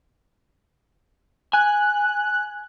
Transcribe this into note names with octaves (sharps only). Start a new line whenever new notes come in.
G#5 F#6